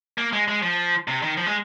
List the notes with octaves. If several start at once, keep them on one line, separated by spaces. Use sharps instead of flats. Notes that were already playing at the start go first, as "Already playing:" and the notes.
A#3
G#3
G#3
F3
C3
D#3
F3
G#3